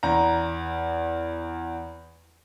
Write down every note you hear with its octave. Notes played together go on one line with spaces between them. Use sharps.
E2 A#5